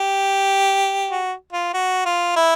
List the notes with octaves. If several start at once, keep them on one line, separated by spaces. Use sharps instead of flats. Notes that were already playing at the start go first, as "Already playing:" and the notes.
Already playing: G4
F#4
F4
F#4
F4
E4